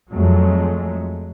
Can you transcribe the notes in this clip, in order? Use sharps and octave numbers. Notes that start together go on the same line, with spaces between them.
F2 F#3 G#3 A3